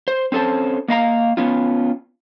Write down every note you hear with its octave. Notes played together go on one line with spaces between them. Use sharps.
C5
C4 C#4 A4 C5 A5
A#3 D#5 F5 A#5
B3 C#4 F4